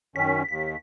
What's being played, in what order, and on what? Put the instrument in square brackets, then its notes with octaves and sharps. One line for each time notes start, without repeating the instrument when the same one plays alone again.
[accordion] F#2 D#3 C#4 [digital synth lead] B6
[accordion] D#2 [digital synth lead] B6